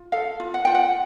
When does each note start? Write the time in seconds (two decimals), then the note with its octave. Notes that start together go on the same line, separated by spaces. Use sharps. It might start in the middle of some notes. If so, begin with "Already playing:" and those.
Already playing: F4
0.12 A4 F5
0.40 F4
0.54 F#5
0.65 F4 G5
0.75 F#5